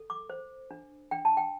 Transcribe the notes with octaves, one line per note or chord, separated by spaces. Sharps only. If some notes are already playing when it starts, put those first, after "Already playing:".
Already playing: A4
D6
C5
D4
D4 G5
A5
G5